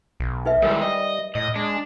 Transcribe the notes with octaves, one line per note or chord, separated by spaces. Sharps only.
B1
D#4 B4 E5
D#3 G3 G#3 E4 A#4 C#5
C#5 D#5
A2 D#5
G#3 D4